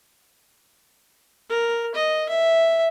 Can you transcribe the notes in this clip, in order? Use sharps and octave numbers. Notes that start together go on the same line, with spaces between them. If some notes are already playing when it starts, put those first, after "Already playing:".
A#4
D#5
E5